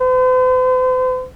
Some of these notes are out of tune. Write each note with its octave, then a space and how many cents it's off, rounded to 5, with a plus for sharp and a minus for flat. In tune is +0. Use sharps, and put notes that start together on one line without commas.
C5 -45